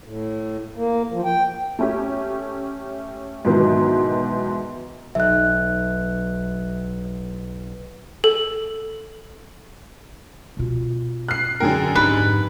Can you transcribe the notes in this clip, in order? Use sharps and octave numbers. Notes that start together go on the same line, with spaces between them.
A2
A#3
F3
G5
A3 C#4 G4
G#2 B2 D#3 E3 F#3
B1 E5 F#6
A4
B2 F4
F6 F#6 C7
F#2 D3 D4 G#4 A#4 G5
F2 G#2 D#4 G4 B4 B5